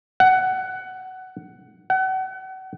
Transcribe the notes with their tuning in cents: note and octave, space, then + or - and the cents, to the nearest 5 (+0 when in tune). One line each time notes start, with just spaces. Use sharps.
F#5 +15
F#5 +35